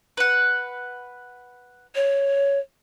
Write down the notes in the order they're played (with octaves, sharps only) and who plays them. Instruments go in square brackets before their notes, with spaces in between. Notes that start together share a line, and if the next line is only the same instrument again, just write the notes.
[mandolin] B4 F#5
[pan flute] C#5